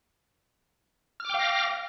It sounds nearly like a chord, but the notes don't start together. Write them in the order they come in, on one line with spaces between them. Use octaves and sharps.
F6 D6 G5 F5 A#6